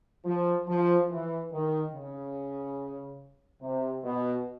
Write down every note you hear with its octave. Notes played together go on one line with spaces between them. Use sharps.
F3
F3
E3
D#3
C#3
C3
B2